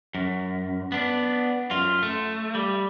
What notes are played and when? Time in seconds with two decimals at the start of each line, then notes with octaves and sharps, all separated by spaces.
0.15 F#2
0.92 B3 D4
1.71 F#2 F4
2.03 A3
2.55 G3